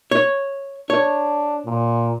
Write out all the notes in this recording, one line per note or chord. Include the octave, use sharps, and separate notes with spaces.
C#5
D4 C#5
A#2